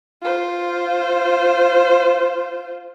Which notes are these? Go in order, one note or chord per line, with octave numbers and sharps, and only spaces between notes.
F4 C5